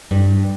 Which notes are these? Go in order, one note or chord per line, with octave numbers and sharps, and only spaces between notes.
G2